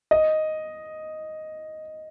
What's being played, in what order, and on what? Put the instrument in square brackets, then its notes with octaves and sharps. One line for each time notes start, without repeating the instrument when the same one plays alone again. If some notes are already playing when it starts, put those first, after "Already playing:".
[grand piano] D#5